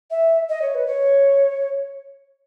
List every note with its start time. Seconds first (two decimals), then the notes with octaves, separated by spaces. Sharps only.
0.11 E5
0.49 D#5
0.62 C#5
0.75 B4
0.87 C#5